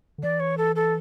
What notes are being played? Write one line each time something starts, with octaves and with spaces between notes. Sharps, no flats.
D3
E3 D5
C#5
A4
A4